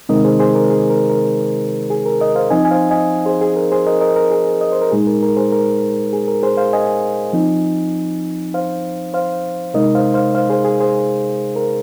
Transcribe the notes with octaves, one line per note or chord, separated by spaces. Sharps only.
C3 D#3 G#3 C4 D#4 A#4 D#5
G#4 C5
G#4 C5
A#4
G#4
A#4
A#4
G#4
A#4
A#4 D#5
C5 F5
F3 C4 D#4 D#5 G#5
G#5
C5 F5
D#5 G#5
G#4 C5
G#4
A#4
G#4 C5
A#4 D#5
A#4 D#5
A#4
G#4
D#5
C5
A#4
A#2 G#3 D#4 G#4
A#4
A#4
G#4 C5
A#4
G#4
A#4
G#4 C5
C5 F5
D#5 G#5
F3 C4 D#4
C5 F5
C5 F5
C3 G#3 D#4 A#4 D#5
C5 F5
C5 F5
C5 F5
G#4 C5
G#4
G#4 C5
A#4